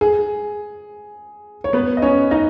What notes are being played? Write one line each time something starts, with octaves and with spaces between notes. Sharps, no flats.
G#4
C#5
B3 B4
D#5
C#4 C#5
D#4 D#5